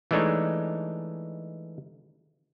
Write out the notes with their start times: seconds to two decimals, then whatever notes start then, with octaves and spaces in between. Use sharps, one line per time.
0.11 E3 G#3 A3 D4 D#4 C#5